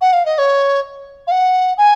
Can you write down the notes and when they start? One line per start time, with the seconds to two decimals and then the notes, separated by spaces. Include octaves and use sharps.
0.01 F#5
0.13 F5
0.25 D#5
0.38 C#5
1.27 F5
1.31 F#5
1.77 G#5